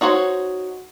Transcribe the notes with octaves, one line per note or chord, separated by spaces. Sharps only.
D#4 F#4 C5 C#5